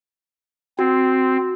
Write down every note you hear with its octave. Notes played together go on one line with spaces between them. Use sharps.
C4 F#4